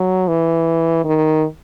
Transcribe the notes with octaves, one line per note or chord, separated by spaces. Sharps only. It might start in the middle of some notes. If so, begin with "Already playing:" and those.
Already playing: F#3
E3
D#3